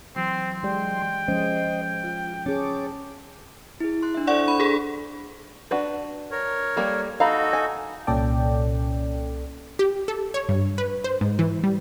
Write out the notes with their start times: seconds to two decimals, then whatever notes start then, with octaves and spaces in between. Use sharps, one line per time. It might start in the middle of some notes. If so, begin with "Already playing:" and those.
0.16 E3 F#3 C4 C6
0.63 G#3 G4 D5 G5
1.28 F3 G#3 C#4 C5 D#5
2.04 F4
2.46 C#4 G#4 C#5 A5 D6
3.80 E4 G#4
4.02 C6 F#6
4.14 D4 E5
4.27 A4 C5 D5 F#5 C#6
4.48 D4 B5
4.60 G#4 A4
5.71 D4 F#4 B4
6.31 A#4 C#5
6.76 G3 A#3 A4
7.20 D#4 F#4 A4 F5 A#5 B5
7.53 G#5
8.07 C2 A#2 C#4 A4 D5 G5
9.79 G4
10.08 A4
10.34 C#5
10.49 G2
10.78 B4
11.04 C5
11.21 G#2
11.39 E3
11.64 G3